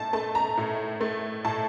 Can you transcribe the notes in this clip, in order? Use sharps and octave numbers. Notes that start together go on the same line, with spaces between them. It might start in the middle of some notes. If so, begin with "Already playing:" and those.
Already playing: A2 A5
A3 A5
A#5
A2
A3
A2 A5